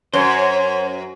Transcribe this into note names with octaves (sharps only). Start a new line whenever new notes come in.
F#2 C5 C#5